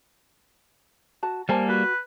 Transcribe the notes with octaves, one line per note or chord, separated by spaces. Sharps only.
F#4 A5
G3 A#3 C5 G#5 A5
F#4 B4